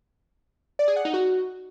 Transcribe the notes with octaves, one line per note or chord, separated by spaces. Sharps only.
D5
G#4
F#5
D#4
F#4